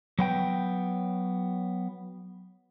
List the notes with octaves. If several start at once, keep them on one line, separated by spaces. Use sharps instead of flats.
F#3 B3 G5